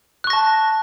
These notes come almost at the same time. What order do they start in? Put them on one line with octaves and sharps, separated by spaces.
F#6 C#6 A#6 A5